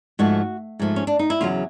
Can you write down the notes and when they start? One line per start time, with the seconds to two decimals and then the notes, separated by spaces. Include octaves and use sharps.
0.19 G#2 F3 A3 F#4
0.79 G#2 F3 A3
0.96 C#4
1.07 D4
1.19 D#4
1.30 E4
1.41 E2 C#3 F#3 F4